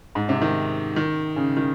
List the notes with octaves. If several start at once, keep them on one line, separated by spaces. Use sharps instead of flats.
G#2
C3
D#3
D#3
C#3
D#3